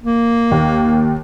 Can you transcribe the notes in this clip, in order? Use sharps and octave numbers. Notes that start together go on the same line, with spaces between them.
A#3
D#2